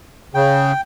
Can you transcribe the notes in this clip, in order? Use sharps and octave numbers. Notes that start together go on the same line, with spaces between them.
C#3 G5